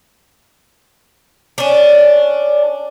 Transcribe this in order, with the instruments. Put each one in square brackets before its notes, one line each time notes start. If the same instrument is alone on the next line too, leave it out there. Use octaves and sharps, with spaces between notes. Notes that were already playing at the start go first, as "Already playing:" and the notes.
[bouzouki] C#4 D4